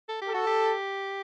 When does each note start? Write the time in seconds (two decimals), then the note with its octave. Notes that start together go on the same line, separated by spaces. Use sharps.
0.09 A4
0.21 G4
0.28 A4
0.34 F#4
0.47 G4